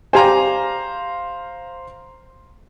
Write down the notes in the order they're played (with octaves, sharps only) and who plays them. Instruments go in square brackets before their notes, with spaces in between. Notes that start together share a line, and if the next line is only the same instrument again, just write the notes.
[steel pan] G4 G#5 [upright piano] C5 F5 A#5